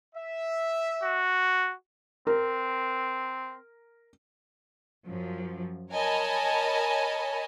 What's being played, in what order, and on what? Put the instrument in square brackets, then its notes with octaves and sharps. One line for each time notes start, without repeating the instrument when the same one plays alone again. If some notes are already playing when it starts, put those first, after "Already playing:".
[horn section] E5
[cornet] F#4
[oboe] C4 [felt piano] A#4
[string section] F#2 F3
A#4 C#5 D#5 G#5 A5 B5